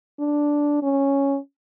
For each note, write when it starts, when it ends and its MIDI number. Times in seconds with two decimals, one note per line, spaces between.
0.19 0.81 62
0.82 1.37 61